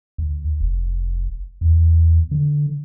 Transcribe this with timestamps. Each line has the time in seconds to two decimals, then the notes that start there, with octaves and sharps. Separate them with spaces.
0.18 D2
0.61 F1
1.61 E2
2.31 D3